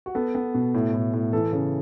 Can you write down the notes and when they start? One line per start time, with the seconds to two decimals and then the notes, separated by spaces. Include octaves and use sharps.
0.06 F#4
0.15 B3 A4
0.35 B3
0.54 B2
0.74 A2
0.94 A2
1.13 A2
1.33 E3 A4
1.52 C#3 A4